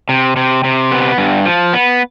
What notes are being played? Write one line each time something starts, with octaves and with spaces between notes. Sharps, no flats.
C3
C3
C3
B3
G2
F3
B3